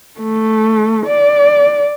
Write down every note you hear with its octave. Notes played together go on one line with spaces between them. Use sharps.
A3
D5